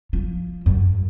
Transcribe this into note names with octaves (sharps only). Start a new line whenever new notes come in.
F3
F#2